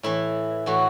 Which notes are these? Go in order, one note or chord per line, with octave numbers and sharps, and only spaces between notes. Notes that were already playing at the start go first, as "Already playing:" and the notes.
A2 E3 E4
A2 E3 F#4